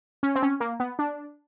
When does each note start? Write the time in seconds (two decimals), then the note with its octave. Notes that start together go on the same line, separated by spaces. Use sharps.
0.23 C#4
0.35 C4
0.43 C#4
0.60 A#3
0.80 B3
0.99 D4